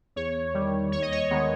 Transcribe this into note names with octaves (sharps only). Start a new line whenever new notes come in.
E2 C#5
D#3 G3
D#2 C#5
D#5
C#5
D#3 G#3 B3